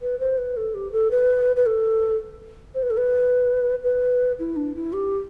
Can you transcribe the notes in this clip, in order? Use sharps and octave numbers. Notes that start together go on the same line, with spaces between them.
B4
C5
B4
A4
G4
A4
B4
B4
A4
C5
B4
A4
B4
B4
E4
D4
E4
G4